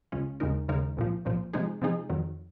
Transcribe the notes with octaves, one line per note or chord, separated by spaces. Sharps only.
C#2 C#3 G#3 C#4 F4
D#2 C#3 G#3 D#4 A#4
D#2 C#3 G#3 D#4 A#4
C2 A#2 F3
C2 A#2 F3
C3 F3 G#3 D#4 G#4
C3 F3 G#3 D#4 G#4
F2 D#3 F#3